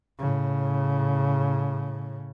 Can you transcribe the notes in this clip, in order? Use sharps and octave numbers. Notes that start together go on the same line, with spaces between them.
A2 C#3